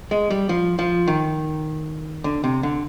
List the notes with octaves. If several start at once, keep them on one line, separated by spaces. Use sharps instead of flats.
G#3
G3
F3
F3
D#3
D3
C3
D3